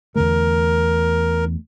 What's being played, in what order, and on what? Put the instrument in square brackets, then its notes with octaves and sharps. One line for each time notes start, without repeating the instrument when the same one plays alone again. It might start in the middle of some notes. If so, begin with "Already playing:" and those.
[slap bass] E2 D3 A3 [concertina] A#4